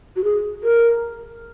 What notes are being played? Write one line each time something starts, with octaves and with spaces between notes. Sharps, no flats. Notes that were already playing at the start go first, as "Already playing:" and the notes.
F#4
G#4
A#4